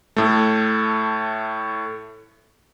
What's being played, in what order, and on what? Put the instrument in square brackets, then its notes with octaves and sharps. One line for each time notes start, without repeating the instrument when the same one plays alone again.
[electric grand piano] A2 A3